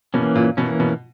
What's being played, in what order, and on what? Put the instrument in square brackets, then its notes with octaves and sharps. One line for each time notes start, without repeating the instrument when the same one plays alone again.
[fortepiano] B2 [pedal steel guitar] E3 A#3 C#4
[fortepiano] A#2
[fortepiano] B2 [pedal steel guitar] E3 A#3 C#4
[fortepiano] B2